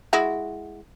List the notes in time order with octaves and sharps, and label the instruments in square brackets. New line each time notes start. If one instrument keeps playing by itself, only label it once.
[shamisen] G#3 E4 F#4